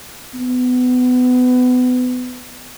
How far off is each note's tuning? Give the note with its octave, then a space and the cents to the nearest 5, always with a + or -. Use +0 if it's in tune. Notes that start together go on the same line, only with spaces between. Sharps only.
B3 +25